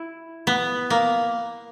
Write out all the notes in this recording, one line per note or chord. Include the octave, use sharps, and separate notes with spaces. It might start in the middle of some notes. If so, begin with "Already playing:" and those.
Already playing: E4
B3
A#3